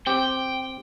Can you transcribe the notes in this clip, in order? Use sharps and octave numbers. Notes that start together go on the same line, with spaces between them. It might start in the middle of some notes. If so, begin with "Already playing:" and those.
C4 G4 G5